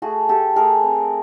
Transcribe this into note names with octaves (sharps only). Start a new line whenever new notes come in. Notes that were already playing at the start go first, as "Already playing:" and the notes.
A3 F#4 G#4
A3 G4 A4
A3 G#4 A#4
C4